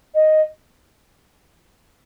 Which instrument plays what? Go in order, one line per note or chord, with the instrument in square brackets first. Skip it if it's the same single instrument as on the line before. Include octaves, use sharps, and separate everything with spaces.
[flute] D#5